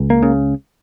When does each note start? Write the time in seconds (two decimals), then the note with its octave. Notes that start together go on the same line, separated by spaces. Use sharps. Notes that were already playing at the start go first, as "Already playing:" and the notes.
Already playing: C#2
0.10 A#3
0.23 C#3